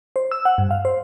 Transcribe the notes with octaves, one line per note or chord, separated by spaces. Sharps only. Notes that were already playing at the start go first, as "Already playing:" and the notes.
C5
E6
F#5
G2
F5
C5